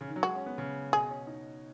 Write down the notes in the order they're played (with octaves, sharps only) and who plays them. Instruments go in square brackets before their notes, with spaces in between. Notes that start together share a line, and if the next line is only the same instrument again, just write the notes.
[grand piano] C#3
D#3
F#3
[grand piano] G#3 [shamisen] F#4
[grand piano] C#4
B3
C#3
[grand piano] B2 [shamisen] G#4
[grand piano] C#4
D#4